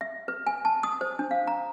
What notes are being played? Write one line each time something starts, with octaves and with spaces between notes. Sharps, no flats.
E5
B4
G#5
A5
D#6
C5
D4
F5
A#5